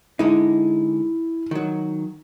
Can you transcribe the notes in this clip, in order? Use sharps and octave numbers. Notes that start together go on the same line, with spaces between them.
D3 G#3 D#4 E4
D#3 F#3